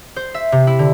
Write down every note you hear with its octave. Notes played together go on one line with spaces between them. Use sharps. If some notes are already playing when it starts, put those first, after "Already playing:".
C5
E5
C3
E4
D3